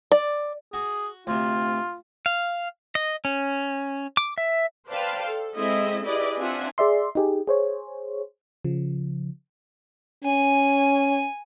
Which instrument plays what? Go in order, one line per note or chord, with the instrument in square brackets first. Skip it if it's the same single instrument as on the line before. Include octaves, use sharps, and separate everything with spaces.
[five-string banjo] D5
[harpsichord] F#4 [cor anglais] G#4
[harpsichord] D2 C3 [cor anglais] F4
[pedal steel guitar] F5
D#5
C#4
D6
E5
[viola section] B4 C5 D5 F5 G5 A5
A4
G#3 C4 E4 A4 D#5 E5
E4 G4 G#4 B4 D5 D#5
C4 D4 F4 E5 F#5 G#5
[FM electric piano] G#4 D5 E5 C6
D#4 G4 G#4
G#4 C5 C#5
C#3 F3
[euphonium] C#4 [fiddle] G#5